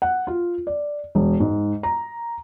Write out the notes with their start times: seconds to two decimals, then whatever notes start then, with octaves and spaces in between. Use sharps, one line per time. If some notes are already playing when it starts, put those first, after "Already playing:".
0.02 F#5
0.27 F4
0.67 D5
1.15 E1
1.40 G#2
1.83 A#5